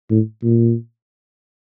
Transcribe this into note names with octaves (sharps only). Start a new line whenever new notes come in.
A2
A#2